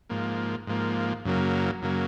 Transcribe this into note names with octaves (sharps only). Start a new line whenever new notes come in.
G#2 F3 A#3
G#2 F3 A#3
F#2 C#3 F#3 A#3
F#2 C#3 F#3 A#3